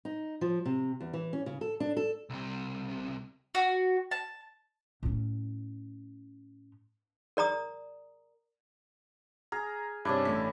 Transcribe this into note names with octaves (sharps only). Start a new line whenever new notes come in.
D#4
F3
C3
E2
E3
C#4
C#3
A4
D4
A4
C2 C3
F#4
A5
A2 C#4
A#4 D5 A#5 D#6
G#4 A#5 F6
G2 C3 C#4 D4 E4
A1 A3 B6